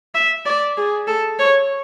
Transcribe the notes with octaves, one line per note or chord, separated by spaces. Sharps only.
E5
D5
G#4
A4
C#5